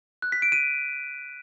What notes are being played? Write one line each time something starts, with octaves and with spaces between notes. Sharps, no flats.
F#6
B6
D7
D#7